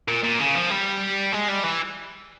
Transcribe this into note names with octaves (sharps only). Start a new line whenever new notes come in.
A#2
A#2
C#3
F3
G3
G#3
G3
E3